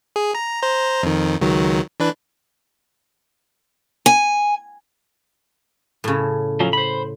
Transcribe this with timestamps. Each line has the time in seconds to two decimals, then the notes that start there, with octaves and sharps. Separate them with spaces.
0.16 G#4
0.35 A#5
0.62 C5 A#5
1.03 F2 D#3
1.41 C#2 D#3 F#3
2.00 E3 D4 B4
4.06 G#5
6.04 A2 C#3
6.60 F3 F#3 C#4
6.73 C5 B5